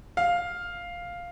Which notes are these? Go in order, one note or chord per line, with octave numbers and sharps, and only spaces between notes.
F5